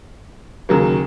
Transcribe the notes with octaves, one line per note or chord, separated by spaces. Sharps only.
D#2 C#3 F#3 A#3